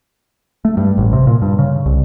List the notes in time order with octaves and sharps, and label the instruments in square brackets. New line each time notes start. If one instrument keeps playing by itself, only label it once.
[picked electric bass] A3
G2
A1
C3
A#2
G2
C#3
C2